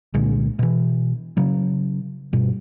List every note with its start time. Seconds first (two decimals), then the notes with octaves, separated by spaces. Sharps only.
0.14 C2 A#2 D3 G#3
0.59 B2 E3
1.37 C#3 F#3
2.33 G2 B2